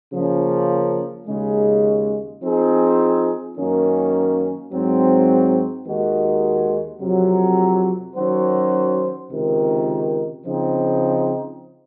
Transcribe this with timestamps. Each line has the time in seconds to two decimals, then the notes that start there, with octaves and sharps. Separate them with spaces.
0.12 C#3 F3 A#3 C#4
1.27 D#2 C#3 G#3
2.42 F3 C4 D#4 G#4
3.57 F#2 D#3 A#3 C#4
4.72 G#2 F#3 C4
5.86 D#2 D#3 G#3 D#4 F#4
7.01 F2 C3 F#3
8.15 D#3 F#3 C#4 F#4 C5
9.30 C#2 C3 D#3
10.45 C#3 F3 C4 D#4